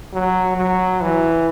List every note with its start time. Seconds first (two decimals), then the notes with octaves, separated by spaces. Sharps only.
0.14 F#3
0.57 F#3
1.01 E3